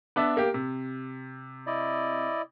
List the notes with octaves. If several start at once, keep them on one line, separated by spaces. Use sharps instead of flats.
B3 D4 E5
A#3 G4
C3
E4 D5 D#5